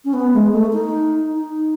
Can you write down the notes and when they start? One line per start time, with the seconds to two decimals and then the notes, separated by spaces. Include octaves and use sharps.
0.05 C#4
0.13 B3
0.34 G#3
0.52 A3
0.73 D#4
1.32 D#4